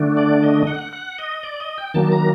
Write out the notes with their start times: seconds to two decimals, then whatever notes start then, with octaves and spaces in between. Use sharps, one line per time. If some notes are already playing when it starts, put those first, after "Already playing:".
Already playing: D3 A3 D4
0.17 D5
0.43 D#5
0.67 F#5
0.93 F#5
1.18 D#5
1.43 D5
1.60 D#5
1.78 G5
1.94 D#3 F#3 A#3 A5
2.12 A#5